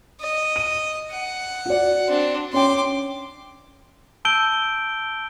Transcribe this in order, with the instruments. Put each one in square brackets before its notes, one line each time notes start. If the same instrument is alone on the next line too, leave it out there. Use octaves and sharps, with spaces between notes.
[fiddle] D#5
[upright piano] D#7
[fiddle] F#5
[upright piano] F#4 D5
[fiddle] C4 D4
[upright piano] C#4 C#5 G5 [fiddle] C6 D6
[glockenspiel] A5 E6 G6 D7 G7